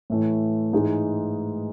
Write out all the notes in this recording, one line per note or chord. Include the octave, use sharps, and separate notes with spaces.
A2 E3 A3
G#2 E3 G#3 D#4